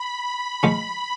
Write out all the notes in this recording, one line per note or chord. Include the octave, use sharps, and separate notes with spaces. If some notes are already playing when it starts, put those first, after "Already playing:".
Already playing: B5
F3 G#3 C#4